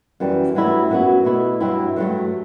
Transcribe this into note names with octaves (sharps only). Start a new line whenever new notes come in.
F#2 E3 G3
G2 F#3 A3 E4
F#2 F#3 B3 F#4
B2 A3 E4
G2 F#3 C4 E4
G2 F#3 A3